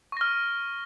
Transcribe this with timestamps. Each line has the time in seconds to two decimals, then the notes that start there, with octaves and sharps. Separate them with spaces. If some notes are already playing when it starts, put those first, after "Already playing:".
0.12 C#6
0.17 A#6
0.21 F6